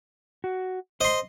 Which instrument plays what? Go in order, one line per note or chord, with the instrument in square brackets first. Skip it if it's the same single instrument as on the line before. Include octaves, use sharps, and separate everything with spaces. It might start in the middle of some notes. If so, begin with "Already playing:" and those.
[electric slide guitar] F#4
[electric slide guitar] C5 [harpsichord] D#5 C6